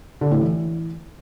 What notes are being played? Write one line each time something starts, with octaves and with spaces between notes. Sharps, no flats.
D3
A2
E3